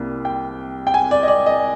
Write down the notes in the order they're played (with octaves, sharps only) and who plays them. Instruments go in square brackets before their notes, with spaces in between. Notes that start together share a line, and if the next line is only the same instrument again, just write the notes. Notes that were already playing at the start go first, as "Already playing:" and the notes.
Already playing: [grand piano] C2 C3 G3 A#3
G5
G5
G#5
D5
D#5
D5
D#5